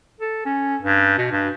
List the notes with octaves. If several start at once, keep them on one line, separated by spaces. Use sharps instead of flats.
A4
C#4
G2
B2
G2